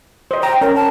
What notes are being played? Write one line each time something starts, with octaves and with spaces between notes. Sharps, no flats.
C5 D#5
G5 A#5
C#4 A#4
A5